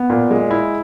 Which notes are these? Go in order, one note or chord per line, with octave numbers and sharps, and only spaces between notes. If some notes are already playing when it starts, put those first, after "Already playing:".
Already playing: B3
A#2
G#3
E4